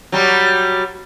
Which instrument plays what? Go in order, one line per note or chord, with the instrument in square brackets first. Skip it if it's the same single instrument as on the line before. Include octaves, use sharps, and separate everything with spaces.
[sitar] F#3 G3